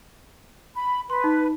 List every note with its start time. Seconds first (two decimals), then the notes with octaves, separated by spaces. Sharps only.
0.75 B5
1.10 B4 C6
1.24 D#4